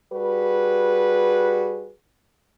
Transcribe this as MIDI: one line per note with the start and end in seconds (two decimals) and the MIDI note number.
0.12 1.92 55
0.12 1.92 66
0.12 1.92 68
0.12 1.92 71